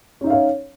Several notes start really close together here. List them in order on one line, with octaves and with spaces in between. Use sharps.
C#4 D#4 E5 F5 C#5